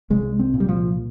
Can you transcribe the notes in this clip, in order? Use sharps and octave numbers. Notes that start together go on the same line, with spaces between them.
C2 G#3
C4
A#2
G3
F3